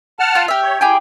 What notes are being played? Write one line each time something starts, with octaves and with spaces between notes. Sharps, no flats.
F#5 A5 F6
F4
G4 E5 F6
C#5
E4 G4 G#4 G5